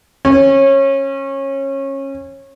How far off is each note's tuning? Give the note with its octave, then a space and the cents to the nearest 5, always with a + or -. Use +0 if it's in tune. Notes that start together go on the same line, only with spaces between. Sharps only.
C#4 -20